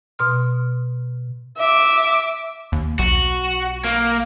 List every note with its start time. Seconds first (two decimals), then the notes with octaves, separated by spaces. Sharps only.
0.19 B2 C6 F6
1.58 E5 D6
2.72 D#2
2.99 B1 F#4
3.84 A#3